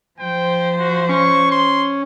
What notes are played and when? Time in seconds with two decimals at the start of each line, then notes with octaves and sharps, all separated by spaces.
0.20 F3 C5 G5
0.79 F#4
1.09 C#4 C#6
1.51 C6